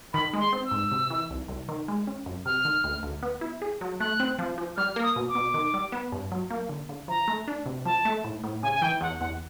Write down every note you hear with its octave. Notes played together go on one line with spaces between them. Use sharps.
D#3 B5
G#3
C6
C4
E6
G#2
C3
E3
C2
C2
D#3
G#3
C#4
F#2
C3 F6
D#3
D2
D2
B3
E4
G#4
F#3
A3 F#6
C4
F3
F3
G3 F6
A#3
D#6
B2
D6
B2
D#3
G3
B3
G2
F#3
A#3
D3
D3
F3 A#5
A3
D4
C3
F3 A5
A3
A2
A2
C#3 G#5
G#5
E3 G5
E2 F#5
E2 F#5